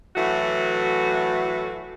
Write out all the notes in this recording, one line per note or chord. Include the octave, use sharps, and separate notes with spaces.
A2 E3 F#3 A3 F#4